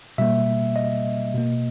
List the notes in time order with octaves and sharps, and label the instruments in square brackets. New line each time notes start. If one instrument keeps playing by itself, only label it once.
[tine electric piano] B2 G3 A#3 E5
D#5
B2 A#3